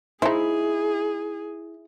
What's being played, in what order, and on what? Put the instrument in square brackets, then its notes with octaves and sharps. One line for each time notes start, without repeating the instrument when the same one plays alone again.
[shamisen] D#4 C5 [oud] E4 [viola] G#4